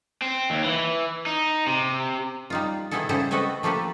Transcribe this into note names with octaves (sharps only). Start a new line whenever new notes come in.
C4
D#2
E3
D#4
C3
G3 D#4 F4
B2 D#3 B3 E4 G#4 A4
C#3 G3 E4 G#4 A4 C5
A3 C4 F#4 A4 B4 D#5
F3 A3 A#3 G4 A4 B4